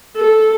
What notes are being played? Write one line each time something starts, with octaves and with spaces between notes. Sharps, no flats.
A4